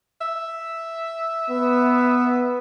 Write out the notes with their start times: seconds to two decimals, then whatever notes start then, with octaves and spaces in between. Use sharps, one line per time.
0.21 E5
1.50 B3